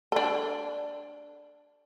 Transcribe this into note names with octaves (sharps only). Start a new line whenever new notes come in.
D4 A4